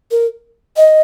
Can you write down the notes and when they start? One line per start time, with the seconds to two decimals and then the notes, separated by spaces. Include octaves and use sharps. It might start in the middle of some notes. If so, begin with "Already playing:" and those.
0.11 A#4
0.77 D#5